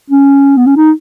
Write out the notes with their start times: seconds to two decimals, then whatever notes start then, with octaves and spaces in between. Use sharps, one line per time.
0.10 C#4
0.57 B3
0.67 C#4
0.77 D#4